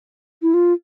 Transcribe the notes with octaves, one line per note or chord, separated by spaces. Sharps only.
E4
F4